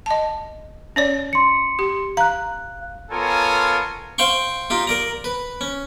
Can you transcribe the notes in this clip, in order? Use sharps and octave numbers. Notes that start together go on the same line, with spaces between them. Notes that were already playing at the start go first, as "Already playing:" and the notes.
D#5 A5
C#4 C#5 D5
C6 C#7
G4
F5 A#5 F#6
B3 F4 A4 A#4 C#5 G#5
C5 F5 G5 C6 C#6
D#4 F4 G4
A#4 D5 A#5
B4
C#4